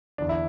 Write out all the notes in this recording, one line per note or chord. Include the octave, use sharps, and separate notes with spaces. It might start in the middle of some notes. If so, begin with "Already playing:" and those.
E2 D3 D4
E4